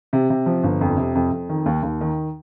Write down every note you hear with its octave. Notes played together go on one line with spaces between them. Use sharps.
C3
C3
F3
G1
F2
C3
F2
F2
D#3
D#2
D#2
D#3